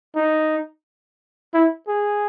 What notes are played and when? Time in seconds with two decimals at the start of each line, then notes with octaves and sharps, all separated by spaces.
0.16 D#4
1.54 E4
1.88 G#4